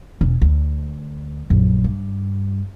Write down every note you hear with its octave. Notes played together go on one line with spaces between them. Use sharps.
E1 C#4
D2
A#1 F#2
G2